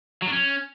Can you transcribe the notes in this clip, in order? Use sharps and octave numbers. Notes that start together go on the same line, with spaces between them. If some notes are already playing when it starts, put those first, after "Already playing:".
F#3
D4
C#4